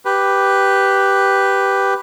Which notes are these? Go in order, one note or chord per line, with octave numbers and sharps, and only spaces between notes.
G4 B4